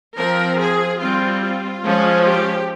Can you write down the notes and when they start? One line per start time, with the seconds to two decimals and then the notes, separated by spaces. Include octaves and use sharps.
0.18 F3 C4 A#4
0.59 G#4
1.00 G3 C4 F4
1.43 F4
1.84 F3 G#3 C#4
2.25 G4